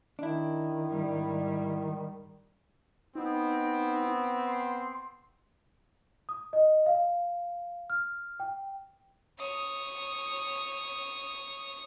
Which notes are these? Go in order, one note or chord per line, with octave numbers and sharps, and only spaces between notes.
D#3 D4 E4
G#2 G3
B3 C4 D#4
C6
D#6
D#5
F5
F6
G5
C#5 D#6